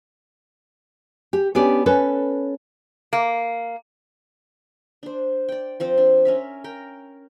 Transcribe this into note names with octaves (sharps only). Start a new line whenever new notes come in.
G4
B3 C#4 D4 G4 D5
C#4 A4 B4
A#3
D4 C5
D5 G5
F3 C4 C5
D4
C#4 A#4 E5
A#4 G5